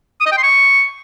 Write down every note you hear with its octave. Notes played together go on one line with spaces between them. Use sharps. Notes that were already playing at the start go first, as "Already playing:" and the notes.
D#6
D#5
G5
C6
C#6